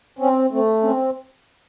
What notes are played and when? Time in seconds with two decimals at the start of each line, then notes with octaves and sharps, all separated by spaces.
0.19 C4 C#4
0.50 A3 C4
0.82 C4 C#4